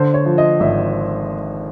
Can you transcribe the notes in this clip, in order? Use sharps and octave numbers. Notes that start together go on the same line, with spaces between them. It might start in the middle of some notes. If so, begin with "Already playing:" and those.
Already playing: D3 C5
C#5
F3
D#5
G#1 E5